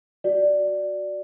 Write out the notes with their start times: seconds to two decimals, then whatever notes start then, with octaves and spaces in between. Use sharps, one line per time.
0.24 F#4 D5
0.67 D5